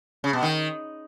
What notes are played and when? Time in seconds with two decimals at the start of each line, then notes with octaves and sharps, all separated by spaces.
0.24 C#3
0.33 B2
0.43 D#3